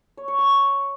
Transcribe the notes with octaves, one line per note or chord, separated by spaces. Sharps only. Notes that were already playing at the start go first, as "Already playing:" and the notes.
C#5
C#5
C#6